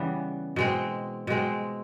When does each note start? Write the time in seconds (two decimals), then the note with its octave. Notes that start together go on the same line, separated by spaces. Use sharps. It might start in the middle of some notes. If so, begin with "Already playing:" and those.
Already playing: C#3 E3 G3 B3
0.56 B2 G#3 C4
1.27 B2 G#3 C4